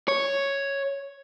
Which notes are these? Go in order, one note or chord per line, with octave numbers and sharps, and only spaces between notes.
C#5